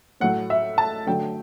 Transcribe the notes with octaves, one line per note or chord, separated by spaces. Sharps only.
A2 F#3 A3 F#5
E5
A5
D3 F#3 A3 G5